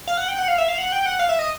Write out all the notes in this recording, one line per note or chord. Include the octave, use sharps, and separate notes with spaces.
F5
F#5
G5
F#5
F5
E5
F5
F#5
G5
F#5
F5
E5
D#5